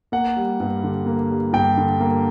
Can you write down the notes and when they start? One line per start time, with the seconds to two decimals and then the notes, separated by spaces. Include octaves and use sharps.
0.12 A#3 F#5
0.36 G3
0.60 G2
0.84 D3
1.06 A#3
1.31 G3
1.53 G2 G5
1.77 D3
2.00 A#3